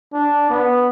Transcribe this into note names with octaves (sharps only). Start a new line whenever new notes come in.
D4
B3